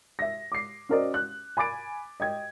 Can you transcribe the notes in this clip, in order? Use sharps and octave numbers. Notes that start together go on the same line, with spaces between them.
E5 A#6
D6 C7
C#4 F#4 A#4 C5 D5 D#5
F#6
G#5 B5 D6 A6 D7
D#5 G5 G#6